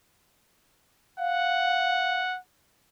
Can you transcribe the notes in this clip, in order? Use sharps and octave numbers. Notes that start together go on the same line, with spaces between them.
F5 F#5